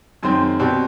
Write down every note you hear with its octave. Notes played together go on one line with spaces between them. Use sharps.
F#2 D#3 G#3 C4 C6
B2 G3 C4